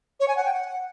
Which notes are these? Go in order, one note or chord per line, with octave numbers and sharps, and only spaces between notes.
C#5
G#5
F#5
G5
F#5